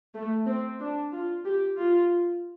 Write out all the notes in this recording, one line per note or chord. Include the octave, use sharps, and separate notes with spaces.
A3
C4
D4
F4
G4
F4